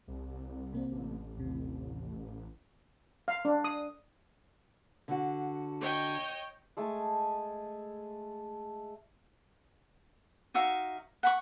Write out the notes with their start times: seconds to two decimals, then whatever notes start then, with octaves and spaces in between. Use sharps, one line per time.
0.08 C2
0.73 C3 A#3 C4
0.91 A1
1.37 D#2 C3
3.28 F5
3.45 D4
3.64 D#6
5.08 D3 F#4
5.81 C#5 D#5 G5
6.77 G#3 A3 G#5 A5
10.54 D#4 F#4 E5 F5
11.23 F#5 B5 C#6